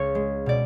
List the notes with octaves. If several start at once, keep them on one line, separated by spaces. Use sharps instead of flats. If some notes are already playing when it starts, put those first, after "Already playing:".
Already playing: C#2 C#5 C#6
G#3
B2 D5